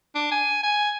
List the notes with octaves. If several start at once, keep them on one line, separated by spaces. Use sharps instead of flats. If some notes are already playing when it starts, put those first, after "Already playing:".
D4
G#5
G#5